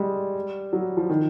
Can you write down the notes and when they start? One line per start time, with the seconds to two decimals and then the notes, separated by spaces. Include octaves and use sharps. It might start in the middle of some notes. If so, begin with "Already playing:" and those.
Already playing: G3 G#3
0.73 F#3
0.97 F3
1.09 D#3